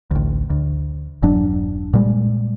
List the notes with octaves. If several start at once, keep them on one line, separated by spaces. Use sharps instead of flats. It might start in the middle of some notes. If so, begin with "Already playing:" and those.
A1 D2
D2
E1 G2 F#3 D4
A#2 G3 G#3